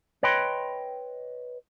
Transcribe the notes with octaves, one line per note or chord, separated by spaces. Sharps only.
B4 C#5 D#5 G5 B5 C6